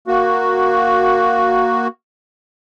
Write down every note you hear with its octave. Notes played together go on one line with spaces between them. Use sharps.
A#3 F#4